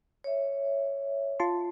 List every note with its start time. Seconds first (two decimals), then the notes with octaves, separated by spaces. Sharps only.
0.24 C#5 E5
1.40 F4 A5 C6